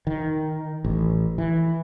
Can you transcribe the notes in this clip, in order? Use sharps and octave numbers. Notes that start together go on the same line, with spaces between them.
D#3
A1
E3